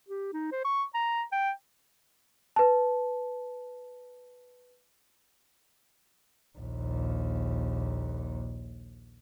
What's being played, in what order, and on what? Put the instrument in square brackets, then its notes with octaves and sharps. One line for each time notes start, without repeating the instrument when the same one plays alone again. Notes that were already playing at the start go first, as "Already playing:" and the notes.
[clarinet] G4
D#4
C5
C#6
A#5
G5
[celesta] B4 A5
[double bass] A#1 D#2